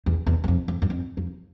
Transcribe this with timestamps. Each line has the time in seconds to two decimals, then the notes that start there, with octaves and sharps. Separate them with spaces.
0.06 E2
0.26 E2
0.44 E2
0.48 F2
0.68 F2
0.82 F#2
0.90 F2
1.17 F2